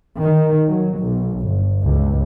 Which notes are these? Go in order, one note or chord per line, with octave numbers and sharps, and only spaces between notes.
D#3
F#3
B1
G1
C#2